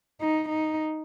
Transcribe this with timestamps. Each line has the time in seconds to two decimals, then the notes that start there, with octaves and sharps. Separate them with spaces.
0.21 D#4
0.49 D#4